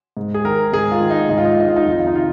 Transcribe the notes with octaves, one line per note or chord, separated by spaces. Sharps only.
G#2
G#4
D#3 A#4
G#2 G#4
F4
D#3
D#4
G#2 D#4
F4
D#4
F4
D#3 D#4
F4
D#4
F2 F4
D#4
F4
D#4
C3 D#3 F4